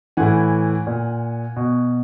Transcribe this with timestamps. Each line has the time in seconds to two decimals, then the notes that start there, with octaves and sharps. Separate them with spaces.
0.17 A2 E3 F#5 G#5
0.87 A#2
1.56 B2